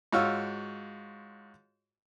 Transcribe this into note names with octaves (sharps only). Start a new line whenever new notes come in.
G#2 F4 F#4 C#5 E6 F6